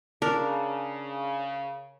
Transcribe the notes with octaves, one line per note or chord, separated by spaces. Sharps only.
C#3 D4 A#4